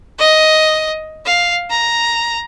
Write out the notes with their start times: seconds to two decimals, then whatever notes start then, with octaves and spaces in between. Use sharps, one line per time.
0.19 D#5
1.26 F5
1.71 A#5